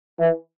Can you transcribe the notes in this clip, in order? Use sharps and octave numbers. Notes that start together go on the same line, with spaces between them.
E3